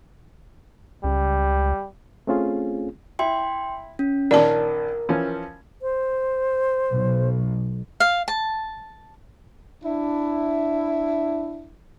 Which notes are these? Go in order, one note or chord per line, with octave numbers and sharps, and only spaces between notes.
C#2 G3
A3 C4 C#4 F4 G#4
E4 G5 C6
C#4
A#1 D#3 C#4 A#4 D5 A5
E3 F3 C#4
C5
B1
F5
A5
D4 E4